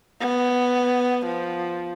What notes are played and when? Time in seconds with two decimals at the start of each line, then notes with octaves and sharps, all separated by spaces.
0.21 B3
1.26 F3